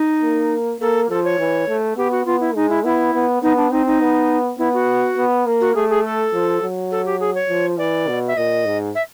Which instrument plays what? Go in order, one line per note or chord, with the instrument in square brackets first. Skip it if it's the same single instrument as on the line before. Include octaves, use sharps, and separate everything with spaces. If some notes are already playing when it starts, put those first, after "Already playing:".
Already playing: [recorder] D#4
[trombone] A#3
[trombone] A#3 [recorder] A4
[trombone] F3 [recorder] A4
[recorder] C#5
[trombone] E3
A3
[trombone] B3 [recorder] G4
[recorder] F#4
[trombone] B3 [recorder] F4
[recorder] E4
[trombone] G#3 [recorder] D#4
[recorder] E4
[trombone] B3 [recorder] E4
[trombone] B3
[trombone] B3 [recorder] D#4
[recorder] D4
[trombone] C4 [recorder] D#4
[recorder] D#4
[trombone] B3
[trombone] B3 [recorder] E4
[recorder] F#4
[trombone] B3
A#3
[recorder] F#4
[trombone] A3 [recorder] G#4
[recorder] G#4
A4
[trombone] F3
F#3
[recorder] A4
G4
G#4
C#5
[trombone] F3
[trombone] E3 [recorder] D5
[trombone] B2
[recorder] E5
[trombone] A#2 [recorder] D#5
[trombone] G#2
[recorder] E5